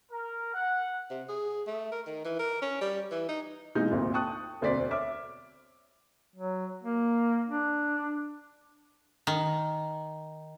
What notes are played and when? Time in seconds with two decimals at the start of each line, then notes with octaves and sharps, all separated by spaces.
0.11 A#4
0.55 F#5
1.11 C3
1.29 G#4
1.67 A3
1.92 A#4
2.06 D#3
2.25 E3
2.39 A#4
2.62 C#4
2.81 G3
3.11 E3
3.29 D#4
3.75 B1 E3 G#3 D#4 G6
3.91 G#1 D2 A#2
4.14 G5 A5 C#6 D#6 F#6
4.61 E1 D2 C4 D5 B6
4.91 C#5 E5 D6 F6
6.36 F#3
6.83 A#3
7.47 D4
9.27 D#3